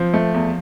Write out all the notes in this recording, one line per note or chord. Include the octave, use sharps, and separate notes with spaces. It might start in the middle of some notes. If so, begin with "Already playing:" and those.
Already playing: F3 C4
A3
E2